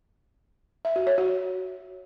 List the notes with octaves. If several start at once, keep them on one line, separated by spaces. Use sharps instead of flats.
E5
F#4
C#5
F#4